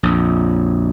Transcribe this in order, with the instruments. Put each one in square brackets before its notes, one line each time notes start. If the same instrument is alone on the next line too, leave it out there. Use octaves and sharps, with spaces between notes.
[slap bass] A#1 F2